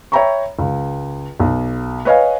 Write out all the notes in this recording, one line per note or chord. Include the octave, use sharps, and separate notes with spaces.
C#5 E5 G5 A#5 B5 C#6
C#2
B1
B4 C#5 D#5 F5 G#5